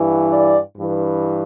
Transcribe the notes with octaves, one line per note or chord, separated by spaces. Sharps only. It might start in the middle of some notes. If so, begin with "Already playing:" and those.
Already playing: G2 E3
D5
G2 E3